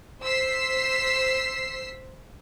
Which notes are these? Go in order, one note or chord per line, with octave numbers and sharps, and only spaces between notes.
C5 E6 B6 C7